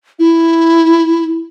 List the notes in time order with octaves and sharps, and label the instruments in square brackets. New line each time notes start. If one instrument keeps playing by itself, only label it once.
[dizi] E4